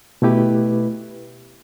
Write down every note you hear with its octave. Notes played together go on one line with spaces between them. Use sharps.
B2 A3 E4 G4 B4